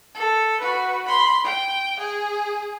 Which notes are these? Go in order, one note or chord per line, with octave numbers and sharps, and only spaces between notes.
A4
F#4 B4
B5 C6
G5
G#4